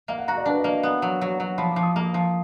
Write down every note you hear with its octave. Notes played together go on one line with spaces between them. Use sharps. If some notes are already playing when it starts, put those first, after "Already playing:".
A#3 F5
F#5
F#4 A#5
D5
D4 B4
D#5
A#3 D5
B3
F#3
F#3
F#3
F3 B5
D6
F3
D#6
A#3
F3